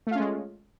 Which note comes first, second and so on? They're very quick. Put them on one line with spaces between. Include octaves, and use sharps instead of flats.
A3 F4 C#4 G#3